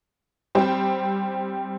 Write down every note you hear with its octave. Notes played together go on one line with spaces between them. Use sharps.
G3 C4 G4 C5